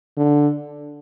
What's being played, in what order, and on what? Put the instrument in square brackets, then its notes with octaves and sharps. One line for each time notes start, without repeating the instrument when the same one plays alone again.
[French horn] D3